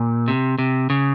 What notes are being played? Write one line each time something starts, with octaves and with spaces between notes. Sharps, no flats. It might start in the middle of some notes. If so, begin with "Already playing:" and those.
Already playing: A#2
C3
C3
C#3